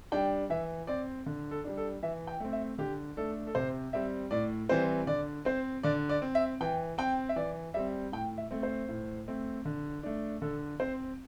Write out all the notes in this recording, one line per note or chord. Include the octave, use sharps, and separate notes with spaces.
G3 D4 G5
E3 E5
C4 D5
D3
A4
G3 D4
A4
E3 E5
G5
A3 C4
E5
D3 G4
A3 D4 A4
A4
C3 C5
G3 C4 E5
A2 D5
E3 G3 C4 C5
D3 D5
C4 C5
D3 D5
D5
C4
E5
E3 G5
C4 G5
E5
E3 D5
G3 C4 E5
A2 G5
E5
A3 C4
C5
A2
A3 C4
D3
A3 D4
D3 A4
C4 C5